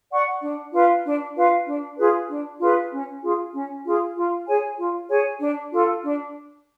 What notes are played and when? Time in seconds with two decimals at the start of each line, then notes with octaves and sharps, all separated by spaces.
0.11 D5 F#5 C#6
0.41 D4
0.72 F4 B4 F5
1.04 D4
1.36 F4 B4 F5
1.66 D4
1.97 F4 G#4 B4
2.29 D4
2.60 F4 G#4 B4
2.91 C#4
3.21 F4 G#4
3.53 C#4
3.84 F4 G#4
4.16 F4
4.47 G#4 C#5 G#5
4.77 F4
5.09 G#4 C#5 G#5
5.40 D4
5.71 F4 A4
6.02 D4